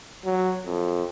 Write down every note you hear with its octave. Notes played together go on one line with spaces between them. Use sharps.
F#3
F2